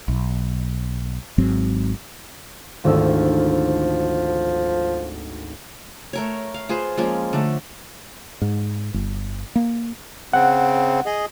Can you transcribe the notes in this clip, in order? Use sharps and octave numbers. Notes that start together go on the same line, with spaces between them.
B1
G#1 G#2 F#3 C4
G#1 D2 F3 E6
A3 A#4 C#5
F5
F4 G#4 B4 C5
F3 G#3 A#3 C#4
D3 A3
G#2
G1
A#3
C#3 C4 F#5
G#4 D#5